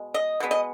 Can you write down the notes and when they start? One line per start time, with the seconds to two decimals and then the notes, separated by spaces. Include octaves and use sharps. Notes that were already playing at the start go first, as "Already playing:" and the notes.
Already playing: B2 G#3
0.14 D#5
0.40 B2 G#3 B3
0.51 D#5